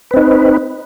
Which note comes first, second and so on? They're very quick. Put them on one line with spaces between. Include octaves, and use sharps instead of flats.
B4 C4 D#4